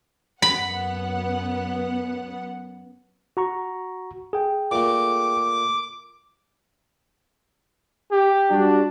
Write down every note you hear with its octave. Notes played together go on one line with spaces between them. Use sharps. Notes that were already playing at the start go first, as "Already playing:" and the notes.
F#2 B3 F#5 B5
F#4 A#5 C#6
G#4 G5
A#2 A3 D6
G4
G3 D4 F#4